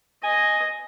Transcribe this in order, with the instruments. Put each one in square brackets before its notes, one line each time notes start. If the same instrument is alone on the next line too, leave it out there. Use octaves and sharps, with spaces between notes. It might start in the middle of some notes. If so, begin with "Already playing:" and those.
[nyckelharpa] D#5 [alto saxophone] G#5